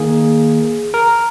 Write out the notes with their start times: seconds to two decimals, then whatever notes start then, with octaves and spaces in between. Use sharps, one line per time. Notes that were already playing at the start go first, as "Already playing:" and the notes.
Already playing: D#3 A#3 G#4
0.94 A#4